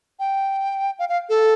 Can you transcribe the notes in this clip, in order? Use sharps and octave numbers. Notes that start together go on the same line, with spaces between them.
G5
F5
F5
A4